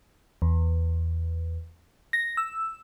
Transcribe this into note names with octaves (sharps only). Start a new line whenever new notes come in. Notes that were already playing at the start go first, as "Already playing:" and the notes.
E2
A#6
E6